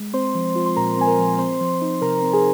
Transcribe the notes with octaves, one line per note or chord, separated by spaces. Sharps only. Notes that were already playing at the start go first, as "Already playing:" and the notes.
Already playing: G#3
C4 C5 C6
F3
F4
C6
A#2 A#4 A#5
C4 G#5
A#4 A#5
F3
C4 C5 C6
F3
D#4
C3 A#4 A#5
C4
G#4 G#5